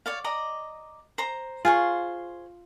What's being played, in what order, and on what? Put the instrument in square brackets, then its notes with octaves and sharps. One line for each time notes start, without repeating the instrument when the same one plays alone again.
[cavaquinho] C#5 D5 F5
D5 D#5 A#5
C5 A#5
[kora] F4 [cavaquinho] G#4 C5 C#6